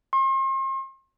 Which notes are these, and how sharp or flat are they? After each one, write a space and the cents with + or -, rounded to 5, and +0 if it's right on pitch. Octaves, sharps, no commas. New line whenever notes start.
C6 +40